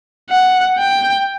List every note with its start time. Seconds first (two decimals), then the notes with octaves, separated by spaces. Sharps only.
0.30 F#5
0.79 G5